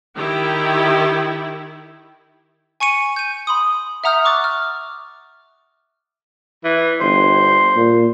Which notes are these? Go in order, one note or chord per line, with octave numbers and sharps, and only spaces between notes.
D#3 E4 G4
G#5 C#6 C#7 D#7
G6 D#7
B5 C6 D#6
E5 F#5 A#5 D#6 F6 G6
C#6 D6 F#6 A6
F6
E3
G1 C5
A#2